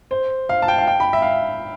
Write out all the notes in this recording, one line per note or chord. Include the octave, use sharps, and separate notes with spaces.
C5
F5
A5
G5
F5
G5
B5
E5
F5